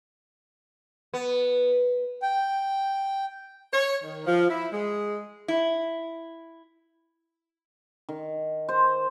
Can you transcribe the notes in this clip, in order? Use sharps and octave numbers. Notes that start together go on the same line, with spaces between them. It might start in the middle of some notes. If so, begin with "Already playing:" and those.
B3
G5
C#5
D#3
F3
E4
G#3
E4
D#3
C5